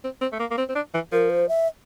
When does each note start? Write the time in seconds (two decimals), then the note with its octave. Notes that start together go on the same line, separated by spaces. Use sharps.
0.04 C4
0.21 C4
0.33 A3
0.40 A#3
0.51 A#3
0.58 C4
0.69 C4
0.75 D4
0.94 E3
1.12 F3 A#4
1.30 C5
1.49 E5